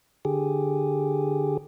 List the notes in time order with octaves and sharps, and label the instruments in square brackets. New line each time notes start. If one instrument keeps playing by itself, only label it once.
[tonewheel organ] D3 G4 G#4